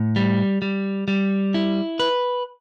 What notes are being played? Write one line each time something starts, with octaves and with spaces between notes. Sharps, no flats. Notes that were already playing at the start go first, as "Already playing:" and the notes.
Already playing: A2
G3
G3
G3
E4
B4